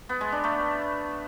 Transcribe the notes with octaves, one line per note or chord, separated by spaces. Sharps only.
B3
G#3
D4
A3